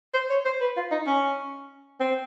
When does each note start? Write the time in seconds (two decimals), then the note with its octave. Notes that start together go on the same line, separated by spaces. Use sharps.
0.14 C5
0.30 C#5
0.45 C5
0.60 B4
0.77 F4
0.91 D#4
1.07 C#4
2.00 C4